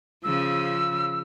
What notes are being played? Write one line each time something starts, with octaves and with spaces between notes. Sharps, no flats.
C#3 F3 E6